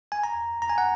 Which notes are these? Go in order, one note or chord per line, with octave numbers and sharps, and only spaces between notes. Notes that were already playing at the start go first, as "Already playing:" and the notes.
G#5
A#5
A#5
G#5
F#5